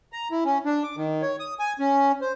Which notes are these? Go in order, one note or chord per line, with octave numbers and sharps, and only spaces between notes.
A#5
E4
C#4
D4
D6
D#3
C#5
D#6
G#5
C#4
C5